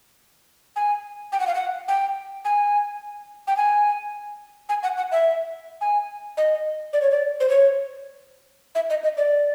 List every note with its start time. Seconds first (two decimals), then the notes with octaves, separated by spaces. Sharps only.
0.76 G#5
1.32 G5
1.40 F#5
1.47 F5
1.55 F#5
1.88 G5
2.45 G#5
3.47 G5
3.57 G#5
4.69 G#5
4.83 F#5
4.97 F#5
5.12 E5
5.81 G#5
6.37 D#5
6.93 D5
7.02 C#5
7.11 D5
7.40 C5
7.50 C#5
8.75 E5
8.90 D#5
9.03 D#5
9.17 D5